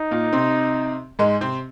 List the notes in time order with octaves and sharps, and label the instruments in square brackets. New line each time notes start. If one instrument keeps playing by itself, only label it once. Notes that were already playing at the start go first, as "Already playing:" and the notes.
Already playing: [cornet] D#4
[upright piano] A#2 A#3
C3 C4
G#2 G#3
C3 C4